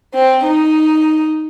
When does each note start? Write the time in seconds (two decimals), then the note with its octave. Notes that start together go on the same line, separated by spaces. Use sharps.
0.15 C4
0.44 D#4